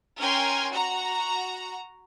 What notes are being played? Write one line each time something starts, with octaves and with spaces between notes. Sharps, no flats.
C#4 A#4 G5 G#5 C6
F#4 A#5